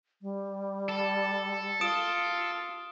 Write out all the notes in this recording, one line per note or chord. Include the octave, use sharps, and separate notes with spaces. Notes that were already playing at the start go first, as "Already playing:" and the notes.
G3
A4
F4 D#6 D7 E7